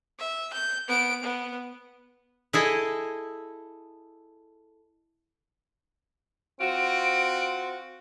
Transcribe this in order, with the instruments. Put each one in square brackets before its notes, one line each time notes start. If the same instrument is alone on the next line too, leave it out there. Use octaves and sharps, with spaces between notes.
[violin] E5
G6
B3 D7
B3
[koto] E4 G#4 A4 D#5
[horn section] C4 F4 F#4 [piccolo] D7